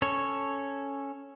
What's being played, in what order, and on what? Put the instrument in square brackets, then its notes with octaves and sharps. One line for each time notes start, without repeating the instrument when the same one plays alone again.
[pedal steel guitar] C#4 A4 C#5